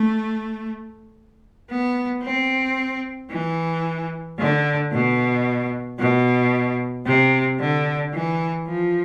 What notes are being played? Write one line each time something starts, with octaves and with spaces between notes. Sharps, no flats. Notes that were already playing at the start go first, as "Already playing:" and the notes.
Already playing: A3
B3
C4
E3
D3
B2
B2
C3
D3
E3
F3